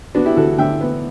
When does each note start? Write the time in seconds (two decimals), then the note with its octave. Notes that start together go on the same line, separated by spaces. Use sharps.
0.15 B3 D4 F#4
0.25 E4 G4
0.36 D2 F#4 A4
0.58 D3 E5 G5
0.81 B3